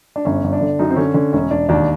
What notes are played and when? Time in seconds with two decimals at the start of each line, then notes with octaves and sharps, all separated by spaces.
0.16 D4
0.25 G1 C#4
0.44 G1
0.53 D4
0.61 D3
0.79 F#2 D#4
0.90 C4
0.96 D3 C#4
1.14 D3 C#4
1.33 E1 C#4
1.50 E1 D4
1.69 D#2 D4